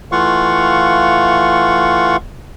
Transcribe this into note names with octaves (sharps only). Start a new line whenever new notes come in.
E3 A3 F4 F5 F#5 C#6